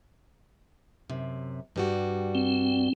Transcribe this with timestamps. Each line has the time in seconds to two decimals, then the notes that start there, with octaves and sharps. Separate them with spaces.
1.10 F#2 C3
1.76 G2 G3 F#4
2.35 C4